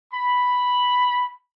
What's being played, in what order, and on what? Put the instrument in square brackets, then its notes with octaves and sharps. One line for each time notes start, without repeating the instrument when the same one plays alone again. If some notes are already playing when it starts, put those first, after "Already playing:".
[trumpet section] B5